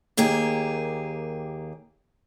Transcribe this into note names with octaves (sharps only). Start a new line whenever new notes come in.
D#2 A#3 G4 G#4